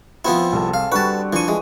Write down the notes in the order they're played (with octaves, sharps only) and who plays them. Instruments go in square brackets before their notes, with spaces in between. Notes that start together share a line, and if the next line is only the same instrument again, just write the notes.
[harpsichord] F3 B3 E4 [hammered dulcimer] C4
[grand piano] C2 [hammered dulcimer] G#4 A4
[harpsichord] F5
[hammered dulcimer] D3 F#4 [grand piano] G3 C#6 [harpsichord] B4 A5
[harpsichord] E3 C#6 [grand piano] F3 D4 D#7
[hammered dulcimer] E3 [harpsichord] G#3